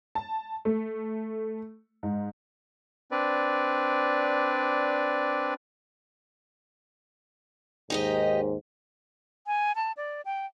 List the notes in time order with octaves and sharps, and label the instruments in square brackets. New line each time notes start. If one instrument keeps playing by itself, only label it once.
[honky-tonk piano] A5
A3
G#2
[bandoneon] C4 D4 B4 D5
[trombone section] D#2 G#2 [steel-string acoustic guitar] D#4 G4 D#5
[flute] G#5
A5
D5
G5